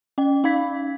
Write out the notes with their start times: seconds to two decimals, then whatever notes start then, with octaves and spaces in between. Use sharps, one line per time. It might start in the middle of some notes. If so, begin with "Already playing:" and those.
0.18 C#4 G5
0.44 C#4 D#4 F5 B5 G#6 B6